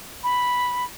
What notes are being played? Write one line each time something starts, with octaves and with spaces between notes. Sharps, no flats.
B5